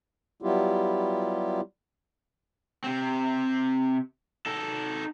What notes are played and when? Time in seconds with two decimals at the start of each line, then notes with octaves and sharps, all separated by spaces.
0.42 F#3 G3 B3 E4 F4 G4
2.84 C3 C4
4.46 D#4 A4